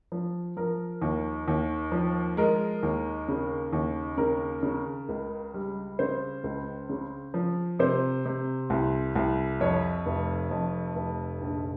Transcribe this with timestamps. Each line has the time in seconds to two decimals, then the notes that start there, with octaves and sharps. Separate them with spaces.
0.12 F3
0.57 F3 A#4
1.02 D#2
1.48 D#2
1.92 F3
2.37 G#3 A#4
2.83 D#2
3.28 C#3
3.73 D#2
4.18 C#3 A#4
4.63 C#3
5.09 C#2
5.54 G3
5.99 C#3 C5
6.44 C#2
6.89 C#3
7.34 F3
7.79 C3 C5
8.25 C3
8.70 C2
9.15 C2
9.60 F2 C#5
10.06 F1
10.51 F2
10.95 F1
11.41 A#1